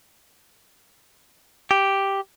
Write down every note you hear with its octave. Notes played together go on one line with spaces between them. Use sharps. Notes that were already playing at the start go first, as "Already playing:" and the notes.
G4